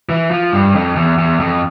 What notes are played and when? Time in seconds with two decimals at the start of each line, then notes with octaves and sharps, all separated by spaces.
0.09 E3
0.31 F3
0.53 G2
0.75 F2
0.96 E2
1.18 E2
1.40 F2